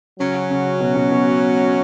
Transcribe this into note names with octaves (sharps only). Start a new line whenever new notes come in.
C#3 F#3 C#4 F#4
C#3
B2
B2
B2